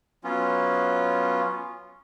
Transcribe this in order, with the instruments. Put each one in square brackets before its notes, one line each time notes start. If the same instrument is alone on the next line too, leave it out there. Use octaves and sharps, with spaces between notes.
[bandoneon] F#3 B3 C#4 F4